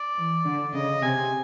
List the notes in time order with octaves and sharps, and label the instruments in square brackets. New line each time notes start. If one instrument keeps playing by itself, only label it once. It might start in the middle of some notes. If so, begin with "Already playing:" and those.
Already playing: [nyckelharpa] D5
[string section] E3
D3
[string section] C#3 [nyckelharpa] D#5
[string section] C3 [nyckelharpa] G#5